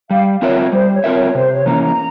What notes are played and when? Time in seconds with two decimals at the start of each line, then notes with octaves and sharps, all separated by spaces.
0.10 G3 F5
0.42 C4 F4 A#4 C#5 E5
0.57 C#5
0.73 G3 C5
0.93 C#5
1.04 C4 F4 A#4 E5
1.14 C#5
1.35 C3 C5
1.51 C#5
1.66 E3 A#3 C#4 A#5
1.82 A#5